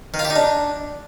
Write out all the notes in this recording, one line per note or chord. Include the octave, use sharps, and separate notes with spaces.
D#3
F4
G4
D#4
D4